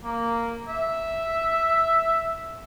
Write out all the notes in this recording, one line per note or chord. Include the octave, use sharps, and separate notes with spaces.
A#3
E5